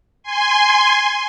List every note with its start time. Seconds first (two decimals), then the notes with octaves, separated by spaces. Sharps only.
0.23 G#5 C6